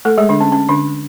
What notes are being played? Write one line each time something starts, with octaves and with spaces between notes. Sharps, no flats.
A3 A4
G#3 G#4
D3 D4
C#4
C#4
D3 D4